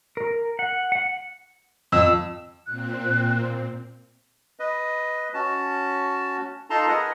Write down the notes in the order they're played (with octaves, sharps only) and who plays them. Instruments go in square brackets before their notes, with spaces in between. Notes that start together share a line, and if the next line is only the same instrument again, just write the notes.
[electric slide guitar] A#4
F#5
F#5
[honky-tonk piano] F2 [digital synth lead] E6
[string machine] A#2 C4 [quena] F#6
[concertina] B4 D#5
C#4 F#4 A5
D#4 F4 A4 A5 A#5 C6
G#4 A#4 B4 D#5 F#5